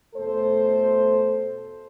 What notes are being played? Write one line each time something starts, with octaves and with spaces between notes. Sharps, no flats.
E2 B2 A3 A4 C5